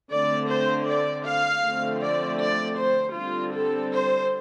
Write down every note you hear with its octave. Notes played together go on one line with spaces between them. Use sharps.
D3 A3 C4 D5
C5
D5
F5
D3 F3 A3 C4
D5
D5
C5
D3 G3 C4 F4
A4
C5